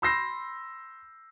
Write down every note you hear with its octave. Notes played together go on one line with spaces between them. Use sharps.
B5 C6 E6 G6 A#6 C7